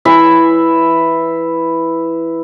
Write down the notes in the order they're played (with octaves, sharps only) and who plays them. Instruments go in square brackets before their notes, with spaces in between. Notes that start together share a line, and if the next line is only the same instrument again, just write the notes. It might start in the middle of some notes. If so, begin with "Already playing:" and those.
[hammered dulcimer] E3 E4 E5